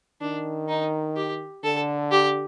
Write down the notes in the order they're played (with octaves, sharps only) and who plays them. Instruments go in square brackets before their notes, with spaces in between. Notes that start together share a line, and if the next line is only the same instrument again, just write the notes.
[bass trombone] D#3 [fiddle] D4
[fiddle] D#4
G4
[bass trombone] D3 [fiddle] A4
[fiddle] G4